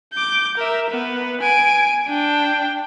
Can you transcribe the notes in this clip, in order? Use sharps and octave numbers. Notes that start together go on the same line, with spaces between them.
D6 G6
A#4 E5
B3 B4
G#5 D7
D4 G5